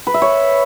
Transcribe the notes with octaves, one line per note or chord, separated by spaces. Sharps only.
B4
E5
C#5